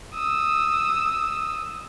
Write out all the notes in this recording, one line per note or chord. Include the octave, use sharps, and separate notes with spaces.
D#6 E6